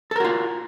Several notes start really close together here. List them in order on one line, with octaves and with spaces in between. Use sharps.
A4 A#4 F#4 F4